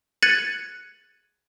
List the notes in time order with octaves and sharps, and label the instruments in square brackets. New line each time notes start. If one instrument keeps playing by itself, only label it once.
[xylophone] F#6 G#6 A6 C#7 D#7 F#7